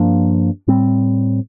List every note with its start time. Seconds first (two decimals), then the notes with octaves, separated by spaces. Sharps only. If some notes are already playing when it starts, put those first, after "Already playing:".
Already playing: G2 F3 A#3 D4
0.68 A2 G3 C4